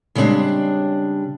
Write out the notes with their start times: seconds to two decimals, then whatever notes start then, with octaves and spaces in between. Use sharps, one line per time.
0.15 C#3 G3 G#3 C4 D4